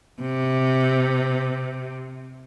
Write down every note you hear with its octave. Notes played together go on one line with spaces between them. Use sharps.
C3